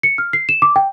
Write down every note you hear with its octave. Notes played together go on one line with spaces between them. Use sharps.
C#7
F6
C7
E7
D6
G5